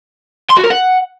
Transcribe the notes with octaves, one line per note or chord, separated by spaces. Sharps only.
C6
F#4
A#4
F#5